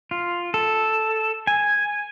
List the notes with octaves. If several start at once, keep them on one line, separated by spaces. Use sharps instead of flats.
F4
A4
G#5